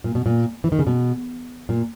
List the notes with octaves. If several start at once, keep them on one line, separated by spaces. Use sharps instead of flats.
A#2
B2
A#2
E3
D#3
C#3
B2
A#2